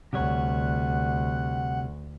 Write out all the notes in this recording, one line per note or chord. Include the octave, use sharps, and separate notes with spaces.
D2 C3 G3 C#5 F#5